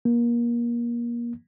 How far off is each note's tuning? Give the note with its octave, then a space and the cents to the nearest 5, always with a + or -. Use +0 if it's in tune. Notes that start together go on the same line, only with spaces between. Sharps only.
A#3 +30